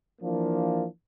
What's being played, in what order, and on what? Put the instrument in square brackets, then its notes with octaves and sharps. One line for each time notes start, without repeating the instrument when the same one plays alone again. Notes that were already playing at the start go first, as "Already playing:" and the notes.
[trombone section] E3 F3 A#3 D4